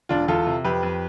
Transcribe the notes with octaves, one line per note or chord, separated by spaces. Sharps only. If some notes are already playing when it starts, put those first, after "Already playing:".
E1 D4 F4
E2 F4 A4
C3
F2 G4 B4
F2